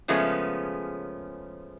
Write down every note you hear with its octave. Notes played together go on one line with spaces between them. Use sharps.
C#3 F3 G#3 A3 B3 C#4